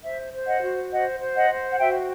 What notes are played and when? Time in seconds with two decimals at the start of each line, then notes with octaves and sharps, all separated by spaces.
0.04 C5 E5
0.34 C5
0.47 D#5 F#5
0.63 F#4
0.91 C5 D#5 F#5
1.20 C5
1.35 D#5 F#5
1.50 C5
1.72 F#5
1.79 F#4 E5 G5